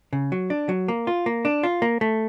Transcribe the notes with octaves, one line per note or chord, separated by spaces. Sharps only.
C#3
F#3
D4
F#3
A#3
F4
A#3
D4
F4
A#3
A3